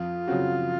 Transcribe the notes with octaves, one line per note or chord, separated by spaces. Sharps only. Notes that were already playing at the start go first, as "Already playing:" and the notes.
Already playing: F2 F4
C#3 F#3 C4 F#4